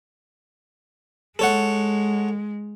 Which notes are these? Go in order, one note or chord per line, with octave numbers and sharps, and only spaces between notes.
G#3 A4 C#5 F#5